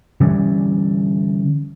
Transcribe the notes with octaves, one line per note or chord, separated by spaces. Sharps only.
D3 E3 G3 C#4